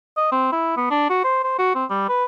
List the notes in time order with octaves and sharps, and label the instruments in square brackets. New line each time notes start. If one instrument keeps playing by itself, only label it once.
[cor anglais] D#5
C4
E4
B3
D4
F#4
C5
C5
F#4
C4
G3
B4